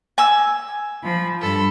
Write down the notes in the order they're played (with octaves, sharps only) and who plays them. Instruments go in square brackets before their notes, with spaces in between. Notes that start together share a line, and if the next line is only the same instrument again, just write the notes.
[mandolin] G#5 E6
[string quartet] F3 B5
G2 A4 B5